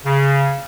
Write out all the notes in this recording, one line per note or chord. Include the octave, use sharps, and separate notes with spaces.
C#3